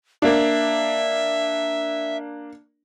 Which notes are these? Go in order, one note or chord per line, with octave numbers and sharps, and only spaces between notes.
A#3 D4 E5